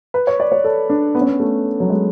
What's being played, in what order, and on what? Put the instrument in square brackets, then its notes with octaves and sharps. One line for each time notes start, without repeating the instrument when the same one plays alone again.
[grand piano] B4
C#5
D5
C#5
A4
D4
B3
C#4
B3
A3
F#3
G#3